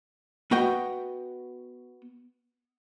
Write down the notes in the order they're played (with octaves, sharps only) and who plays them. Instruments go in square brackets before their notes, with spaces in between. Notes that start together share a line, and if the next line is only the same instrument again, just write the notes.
[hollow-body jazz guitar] B3 F#4 D#5 G5